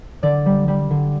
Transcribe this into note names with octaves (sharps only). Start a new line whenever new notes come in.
D3 D5
G3
G3
D3